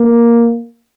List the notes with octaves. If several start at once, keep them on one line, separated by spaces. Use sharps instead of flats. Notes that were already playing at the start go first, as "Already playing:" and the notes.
Already playing: A#3